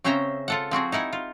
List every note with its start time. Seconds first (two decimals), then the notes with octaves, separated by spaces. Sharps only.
0.04 C#3 C4 C#4 C5 E5 A#5
0.48 F4 A4 F#5
0.71 F3 C4 F#4 G#4
0.92 D#4 E4 F#5 G#5
1.13 F4